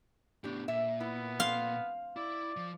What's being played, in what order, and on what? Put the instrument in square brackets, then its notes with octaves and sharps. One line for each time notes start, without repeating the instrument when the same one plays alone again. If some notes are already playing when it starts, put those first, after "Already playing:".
[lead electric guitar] A2 B3 [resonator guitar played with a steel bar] D4 G4
[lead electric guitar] A#2 [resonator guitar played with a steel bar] E5
[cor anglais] B3 [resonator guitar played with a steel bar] E4
[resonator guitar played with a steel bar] C4 [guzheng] F5 C6
[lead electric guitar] E4 [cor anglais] D5
[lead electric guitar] F3